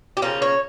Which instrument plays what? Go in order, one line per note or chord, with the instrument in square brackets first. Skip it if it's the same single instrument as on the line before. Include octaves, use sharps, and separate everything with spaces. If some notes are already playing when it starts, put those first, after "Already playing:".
[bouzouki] G4
C#3 F3 A#3 C#4 F4
C#5